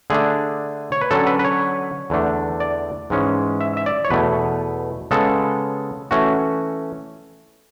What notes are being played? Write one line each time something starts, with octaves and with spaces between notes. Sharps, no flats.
D3 A3 D4 G#4
C#5
B4
D3 F#3 C#4 A4
B4
B4
C#5
E2 D3 A3 D4
D5
G#2 E3 G#3 C#4
E5
E5
D5
C#5
E2 B2 A3 B4
C#3 G#3 B3 A4
E3 A3 C#4 F#4